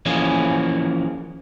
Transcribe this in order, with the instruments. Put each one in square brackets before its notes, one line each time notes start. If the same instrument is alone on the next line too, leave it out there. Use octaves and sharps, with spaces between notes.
[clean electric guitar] E3 F3 A#3 C#4 G#4